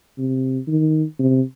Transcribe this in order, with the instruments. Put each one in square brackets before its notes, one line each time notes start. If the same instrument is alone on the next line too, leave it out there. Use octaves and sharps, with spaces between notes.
[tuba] C3
D#3
C3